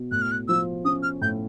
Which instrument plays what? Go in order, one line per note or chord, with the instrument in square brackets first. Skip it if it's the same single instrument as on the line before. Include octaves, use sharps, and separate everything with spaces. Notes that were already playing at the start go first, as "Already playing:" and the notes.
Already playing: [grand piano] B2
[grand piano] A2 [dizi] F#6
[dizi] F6
F#6
[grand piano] F3 [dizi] E6
[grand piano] C#4 [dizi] D#6
[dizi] F6
[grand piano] A2 [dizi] G6